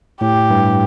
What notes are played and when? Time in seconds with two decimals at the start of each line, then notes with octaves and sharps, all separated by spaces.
0.21 A2 G4
0.50 G2